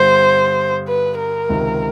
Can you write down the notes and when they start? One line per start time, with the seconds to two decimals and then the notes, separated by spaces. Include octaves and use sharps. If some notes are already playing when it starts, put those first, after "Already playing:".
Already playing: G2 D3 G3 B3 C5
0.88 B4
1.19 A#4
1.49 C#2 C3 D#3